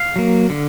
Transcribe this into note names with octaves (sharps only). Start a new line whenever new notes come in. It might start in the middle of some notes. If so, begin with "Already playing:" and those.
Already playing: F5
F#3 A#3
D3